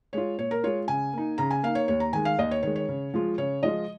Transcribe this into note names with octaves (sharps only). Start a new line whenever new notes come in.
G#3 F4 C#5
A#2 C#5
A#4
G#3 F4 C#5
C#3 G#5
A#3 D#4
C#3 A#5
G#5
A#3 D#4 F5
C#5
D#2 C#5
A#5
D#3 G#3 G#5
F5
D#2 D#5
C#5
D#3 G#3 C#5
C#5
C#3
F3 G#3 F4
C#3 C#5
F3 G#3 F4 D#5